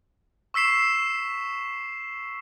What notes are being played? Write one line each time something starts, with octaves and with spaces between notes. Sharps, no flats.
C#6 E6 B6 C7 E7